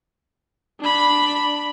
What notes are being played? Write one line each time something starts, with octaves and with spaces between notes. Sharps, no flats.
D4 B5